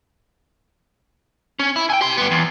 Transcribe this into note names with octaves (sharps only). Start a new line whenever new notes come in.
C#4
E4
G5 G#5
G4 C6
G2 B3
E2